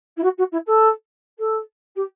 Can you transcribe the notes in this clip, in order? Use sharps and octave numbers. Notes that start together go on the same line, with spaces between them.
E4
F#4
F#4
E4
A4
A4
G4